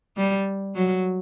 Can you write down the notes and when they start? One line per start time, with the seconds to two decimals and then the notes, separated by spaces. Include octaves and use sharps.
0.17 G3
0.75 F#3